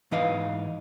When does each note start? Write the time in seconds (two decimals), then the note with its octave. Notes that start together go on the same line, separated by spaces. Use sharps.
0.11 G#2 E3 D#4 B4 D#5 F5